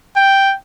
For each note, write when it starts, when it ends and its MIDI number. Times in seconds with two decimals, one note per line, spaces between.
0.16 0.53 79